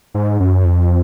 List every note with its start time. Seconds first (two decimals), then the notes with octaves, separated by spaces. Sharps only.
0.14 G#2
0.40 F#2
0.65 F2